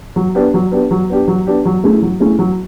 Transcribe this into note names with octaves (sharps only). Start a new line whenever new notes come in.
F#3
B3 D4 G4
F#3
B3 D4 G4
F#3
B3 D4 G4
F#3
B3 D4 G4
F#3
A3 C#4 E4 G#4
F#3
A3 C#4 E4 G#4
F#3